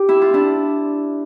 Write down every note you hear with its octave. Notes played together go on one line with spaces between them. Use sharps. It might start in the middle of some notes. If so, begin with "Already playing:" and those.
Already playing: G4
E4
F4
D4 E4